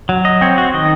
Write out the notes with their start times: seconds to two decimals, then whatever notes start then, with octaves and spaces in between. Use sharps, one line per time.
0.09 F#3
0.25 D#5
0.41 C4 C#5
0.58 F#4
0.74 D#3 D#5